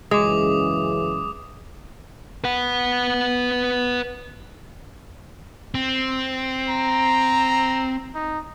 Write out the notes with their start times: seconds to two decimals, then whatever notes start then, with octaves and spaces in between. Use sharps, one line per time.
0.11 F#2 C#3 E3 G#3 D6 D#6
2.44 B4 F#5
5.74 C4
6.69 A#5
8.15 D#4